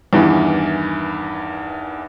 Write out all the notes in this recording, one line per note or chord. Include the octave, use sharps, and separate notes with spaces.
E2 G2 D#3 E3